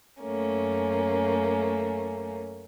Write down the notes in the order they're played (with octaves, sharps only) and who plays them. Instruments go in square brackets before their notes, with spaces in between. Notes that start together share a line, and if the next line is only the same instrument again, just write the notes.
[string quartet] F#2 A3 A#3 C#4